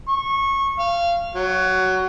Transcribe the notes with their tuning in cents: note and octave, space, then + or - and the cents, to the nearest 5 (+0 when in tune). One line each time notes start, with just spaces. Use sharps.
C#6 -20
F5 -20
F#3 +15